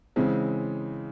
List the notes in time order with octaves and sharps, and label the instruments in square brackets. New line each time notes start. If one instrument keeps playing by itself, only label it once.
[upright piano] C#3 E3 G#3 C4